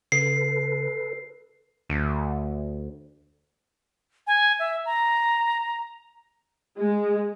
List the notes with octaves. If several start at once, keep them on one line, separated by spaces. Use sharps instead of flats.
C#3 A4 B4 C7
D2
G#5
E5
A#5
G#3